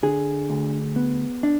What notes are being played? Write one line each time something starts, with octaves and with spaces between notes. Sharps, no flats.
D3 G#4
D2
B3
D4